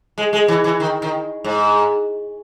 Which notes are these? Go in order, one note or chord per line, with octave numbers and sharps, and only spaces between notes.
G#3
G#3
E3
E3
D#3
D#3
G#2